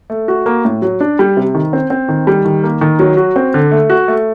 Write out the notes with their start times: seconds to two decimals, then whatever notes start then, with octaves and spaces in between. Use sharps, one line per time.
0.10 A3
0.28 F#4
0.46 A#3
0.65 A2
0.82 F#3
1.01 D4
1.19 G3
1.37 C3
1.55 D#3
1.73 C4
1.90 C4
2.09 D#3
2.27 G3
2.45 D#3
2.63 A#3
2.81 D#3
2.99 F#3
3.17 F#4
3.36 C4
3.54 D3
3.72 A3
3.90 F#4
4.08 A3